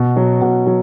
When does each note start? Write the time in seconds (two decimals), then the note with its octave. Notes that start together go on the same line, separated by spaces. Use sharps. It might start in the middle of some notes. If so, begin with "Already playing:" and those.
Already playing: B2
0.16 F#3
0.41 B2
0.67 F#3